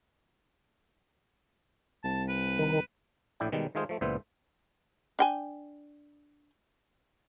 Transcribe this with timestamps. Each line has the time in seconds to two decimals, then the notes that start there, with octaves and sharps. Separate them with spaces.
2.04 C2 A5
2.29 B4
2.59 D#3
3.40 A#1 A2 E4 D5 G5
3.52 B2 D#3 G3 G#3
3.75 D#3 G#3 A3 F4 G#4 C5
3.89 F3 A3
4.01 C#2 A#2 E3 B3 C5 E5
5.19 D4 G5 G#5